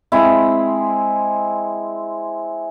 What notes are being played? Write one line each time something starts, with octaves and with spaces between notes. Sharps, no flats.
G#3 C4 E4